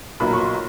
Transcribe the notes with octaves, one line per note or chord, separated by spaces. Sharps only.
B1 A#2 F#3 A#3 B5
C#6
C6